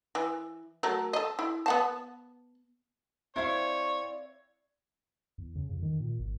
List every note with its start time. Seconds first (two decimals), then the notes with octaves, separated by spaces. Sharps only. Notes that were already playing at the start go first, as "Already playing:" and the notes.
0.15 E3
0.83 F#3 A3 A#4
1.13 A4 D#5
1.39 E4
1.66 B3 F#5 A5
3.36 C4 E4 C#5 D5 F5 G#6
5.38 E2
5.55 C#3
5.69 F2
5.82 D#3
6.00 A#2
6.19 G#1